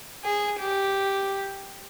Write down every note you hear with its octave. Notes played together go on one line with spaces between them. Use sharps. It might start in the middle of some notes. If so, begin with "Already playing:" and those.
G#4
G4